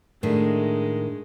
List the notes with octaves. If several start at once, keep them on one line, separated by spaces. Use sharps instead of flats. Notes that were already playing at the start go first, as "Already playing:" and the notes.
A2 D#3 G#3 D4